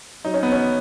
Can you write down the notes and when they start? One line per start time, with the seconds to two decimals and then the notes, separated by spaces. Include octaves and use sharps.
0.25 F#3 D#4
0.34 C#4
0.43 B3
0.52 C#4